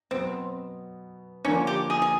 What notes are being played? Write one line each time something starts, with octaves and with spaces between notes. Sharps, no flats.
B2 F#3 B3 C4
D3 F3 A#3 C#4 D4
G4
G#4
G#4